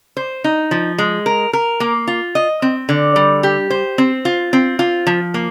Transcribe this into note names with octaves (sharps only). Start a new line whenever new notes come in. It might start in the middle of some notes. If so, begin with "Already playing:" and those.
C5
D#4
F3
G#3
A#4
A#4
A#3
F4
D#5
C4
D3
G3
G4
C5
C4
F4
C4
F4
F3
A#3